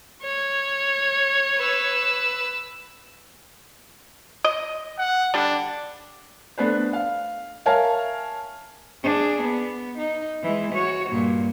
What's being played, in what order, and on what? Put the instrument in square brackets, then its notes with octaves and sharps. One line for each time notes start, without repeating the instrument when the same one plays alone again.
[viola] C#5
[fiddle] B4 E6
[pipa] D#5
[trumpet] F#5
[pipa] D3 G3 [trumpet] D4
[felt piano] A3 B3 D4 B4 C5
F5
A#4 C#5 E5 F5 G#5 A5
[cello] D4 G#4
B3
D#4
E3 G#3
F#4 C#5
G2 A#2